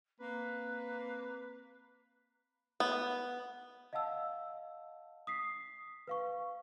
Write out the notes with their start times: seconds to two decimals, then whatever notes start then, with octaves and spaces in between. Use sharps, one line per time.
0.20 A#3 C4 B4 F#6
2.80 B3
3.93 D#5 F5 F#5 A5 E6
5.27 D#6 B6 C7
6.07 B4 F5 C#6